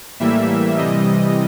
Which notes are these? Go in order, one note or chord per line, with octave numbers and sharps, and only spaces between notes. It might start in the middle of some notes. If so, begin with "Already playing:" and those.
A2 E3 G3 A#3 E5
C3 E3 G3 D#5